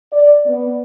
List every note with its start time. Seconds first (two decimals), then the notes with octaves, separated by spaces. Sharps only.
0.12 D5
0.46 B3